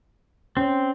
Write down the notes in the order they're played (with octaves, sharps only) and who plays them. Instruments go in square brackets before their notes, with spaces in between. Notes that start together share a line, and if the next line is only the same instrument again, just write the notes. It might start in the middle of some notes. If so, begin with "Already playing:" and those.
[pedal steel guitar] C4 [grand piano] C#4 C#5